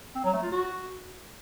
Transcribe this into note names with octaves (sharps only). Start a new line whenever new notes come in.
C4
F#3
A3
F4
F#4